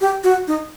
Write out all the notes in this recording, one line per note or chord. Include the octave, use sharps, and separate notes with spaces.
G4
F#4
D#4